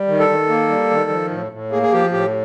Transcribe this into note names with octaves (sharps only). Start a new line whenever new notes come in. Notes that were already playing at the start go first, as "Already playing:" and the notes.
Already playing: G3
D#3
A4
D#3
A#3
G3
D#3
F3
A2
A2
A#3 G#4
G#4
F3 G4
A2 G4